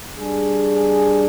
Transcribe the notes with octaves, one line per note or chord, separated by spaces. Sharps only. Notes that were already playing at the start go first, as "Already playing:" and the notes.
G3 D4 G#4